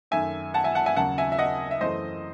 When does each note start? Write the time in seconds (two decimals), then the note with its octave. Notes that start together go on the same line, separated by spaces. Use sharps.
0.11 F#2 D#3 A3 E5 G#5
0.54 F#5 A5
0.64 E5 G#5
0.75 F#5 A5
0.86 E5 G#5
0.96 D#2 C#3 F#3 F#5 A5
1.18 E5 G#5
1.32 E5
1.39 D#5 F#5
1.71 E5
1.81 F#2 E3 A3 C5 D#5